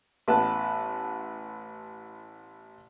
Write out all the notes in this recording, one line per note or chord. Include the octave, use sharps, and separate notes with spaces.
A1 B3 B4 A5